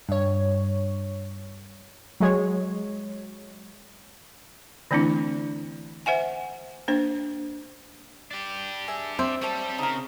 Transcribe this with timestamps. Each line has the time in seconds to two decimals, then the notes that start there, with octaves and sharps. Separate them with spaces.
0.09 G2 C#5
2.20 F#3 G#3 C#5
4.91 D3 E3 A3 C4 D4 E4
6.06 C5 E5 F#5 G#5
6.88 A#3 D4 C5
8.31 D4 G4
8.88 G#4 E5 G#5
9.19 C4 C5 E5
9.41 G3 G4 C#5 E5 A5
9.78 C#3 D#4 A#4